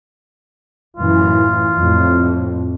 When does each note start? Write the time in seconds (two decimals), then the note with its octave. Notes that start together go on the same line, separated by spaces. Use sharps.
0.97 F#2 A2 E3 F4
1.76 F2 A2